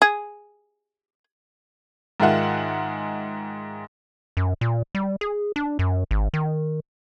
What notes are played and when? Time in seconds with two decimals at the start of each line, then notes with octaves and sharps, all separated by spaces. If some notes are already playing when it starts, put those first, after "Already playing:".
0.02 G#4
2.20 G#2 D#3 F4 G#4 E5 F#5
4.37 F#2
4.61 A#2
4.95 G3
5.21 G#4
5.56 D4
5.79 F#2
6.11 G#1
6.34 D#3